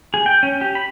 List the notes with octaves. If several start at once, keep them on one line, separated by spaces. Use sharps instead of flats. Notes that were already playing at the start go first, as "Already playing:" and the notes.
G#4
G5
C#4
G4
B5